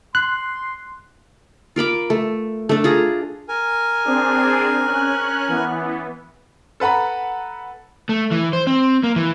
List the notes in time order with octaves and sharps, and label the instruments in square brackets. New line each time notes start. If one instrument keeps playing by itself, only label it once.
[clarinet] C6 [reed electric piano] F#6
[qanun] F4 A#4 B5 D6
A3
A3 D4
F4 G#4 A#5
[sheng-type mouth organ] A#4 G#5
[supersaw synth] C4 D4 G#4
C#4 F#6
E3 B3
[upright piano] A4 B4 F#5 A#5 B5
[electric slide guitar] A3
E3
C5
C4
A#3
E3